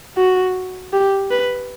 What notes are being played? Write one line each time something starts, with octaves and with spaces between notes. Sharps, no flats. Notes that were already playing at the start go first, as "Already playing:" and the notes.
F#4
G4
B4